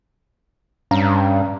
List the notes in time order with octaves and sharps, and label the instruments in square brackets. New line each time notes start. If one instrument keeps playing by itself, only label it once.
[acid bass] G2 [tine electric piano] C#4 F5 A#5